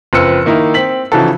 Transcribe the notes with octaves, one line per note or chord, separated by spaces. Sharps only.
F#1 F3 C4 B4 E6 C#7
D#3 A#3 D#4 E4
C4 B6 F#7
C#3 E3 F3 D#4 F#4 A4